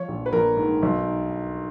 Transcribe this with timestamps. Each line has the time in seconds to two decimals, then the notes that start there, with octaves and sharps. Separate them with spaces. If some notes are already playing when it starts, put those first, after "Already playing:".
Already playing: F3 C#5
0.08 A#1
0.26 B4
0.32 A#1 A#4
0.57 G#2
0.82 B1